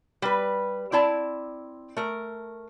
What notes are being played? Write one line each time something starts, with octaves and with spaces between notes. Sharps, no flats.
G3 B4
C4 E4 D5 A5
A3 A#4